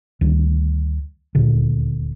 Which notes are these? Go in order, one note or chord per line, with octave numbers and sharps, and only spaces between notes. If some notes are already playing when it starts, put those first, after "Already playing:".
D2 D#3 G3
D#1 D2 A#2 D3